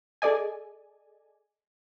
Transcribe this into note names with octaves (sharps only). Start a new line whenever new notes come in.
G#4 A4 D5 D#5 G#5